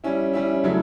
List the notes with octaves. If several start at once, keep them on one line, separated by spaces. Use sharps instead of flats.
G3 C#4 E4
G3 C#4 E4
C#3 F#3 A3 E4